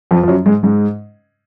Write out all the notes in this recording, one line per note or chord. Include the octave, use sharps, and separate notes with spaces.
F2 F3
F3
F#2 F#3
G#2 G#3
G#2 G#3